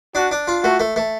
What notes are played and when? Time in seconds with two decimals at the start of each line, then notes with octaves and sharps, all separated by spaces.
0.15 D4 F#4
0.31 D4
0.47 F4
0.64 A3 F#4
0.80 A3
0.96 A3